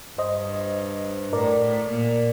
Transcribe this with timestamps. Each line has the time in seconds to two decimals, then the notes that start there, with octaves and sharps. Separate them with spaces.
0.18 G2 C5 D#5
1.33 A2 A#4 D5
1.61 A2
1.90 A#2